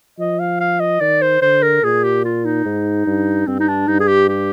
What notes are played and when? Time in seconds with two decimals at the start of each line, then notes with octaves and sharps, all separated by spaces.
0.19 F3 D#5
0.40 F5
0.60 F5
0.80 D#5
1.01 D#3 D5
1.22 C5
1.42 D3 C5
1.63 A#4
1.83 A#2 G#4
2.04 G4
2.25 F4
2.45 D#4
2.65 G#2
3.06 G2
3.47 G2 C4
3.60 D#4
3.68 D4
3.88 G2 D#4
4.00 G#4
4.08 G4
4.29 G4